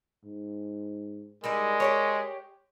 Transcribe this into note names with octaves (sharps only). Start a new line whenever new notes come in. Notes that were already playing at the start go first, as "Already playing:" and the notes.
G#2
G3 G#3 D#4 E4 A#4
G4 G#4 C#5